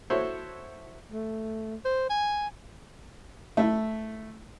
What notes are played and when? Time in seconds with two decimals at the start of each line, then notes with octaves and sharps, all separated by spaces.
0.10 E4 F#4 A4 C5 C#5
1.11 A3
1.85 C5
2.10 G#5
3.57 A3 E4